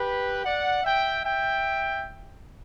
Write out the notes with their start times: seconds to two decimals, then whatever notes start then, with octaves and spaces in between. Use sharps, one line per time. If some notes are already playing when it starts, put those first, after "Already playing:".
Already playing: G4 B4
0.45 D5 F#5
0.84 E5 G5
1.24 E5 G5